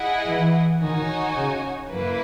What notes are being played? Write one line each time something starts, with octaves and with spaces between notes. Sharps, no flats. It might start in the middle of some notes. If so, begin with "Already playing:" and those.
Already playing: E4 G#4 D#5 F#5
E3
D#3 D#4 F#4 C#5 G#5
C#3
F#2 A#3 E4 B4